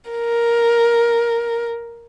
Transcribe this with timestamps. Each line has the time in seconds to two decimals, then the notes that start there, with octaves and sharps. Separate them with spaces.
0.11 A#4